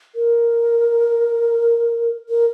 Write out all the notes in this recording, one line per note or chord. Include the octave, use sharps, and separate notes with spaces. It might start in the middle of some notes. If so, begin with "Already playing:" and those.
A#4
A#4